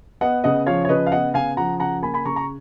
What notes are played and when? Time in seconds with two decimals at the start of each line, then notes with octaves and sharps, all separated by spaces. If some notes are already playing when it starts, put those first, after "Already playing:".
0.21 B3 D#5 F#5
0.44 C#3 D#5 F#5
0.66 F3 C#5 F5
0.85 C#5
0.89 C#3 B4 D#5
1.07 F5
1.12 B3 D#5 F#5
1.34 C#3 F5 G#5
1.57 F3 F#5 A#5
1.80 C#3 F#5 A#5
2.02 A#3 G#5 B5
2.14 G#5 B5
2.25 C#3 A#5 C#6
2.36 A#5 C#6